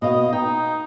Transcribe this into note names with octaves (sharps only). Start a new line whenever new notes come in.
B2 D#5 F5
D#4 G5